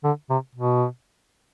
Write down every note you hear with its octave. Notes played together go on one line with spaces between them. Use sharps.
D3
C3
B2